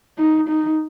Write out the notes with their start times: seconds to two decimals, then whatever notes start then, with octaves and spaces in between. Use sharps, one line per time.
0.18 D#4
0.48 D#4